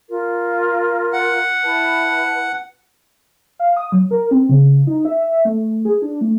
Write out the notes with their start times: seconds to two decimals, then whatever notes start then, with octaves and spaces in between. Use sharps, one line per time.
0.09 F4 A#4
1.13 F#5
1.62 E4 B4 A5
3.59 F5
3.77 D#6
3.92 F#3
4.11 A#4
4.31 C4
4.49 C#3
4.87 D#4
5.05 E5
5.45 A3
5.85 G#4
6.02 D4
6.21 A3